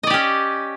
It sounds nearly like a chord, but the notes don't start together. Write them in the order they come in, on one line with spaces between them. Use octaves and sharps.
D#5 D5 G4 C#4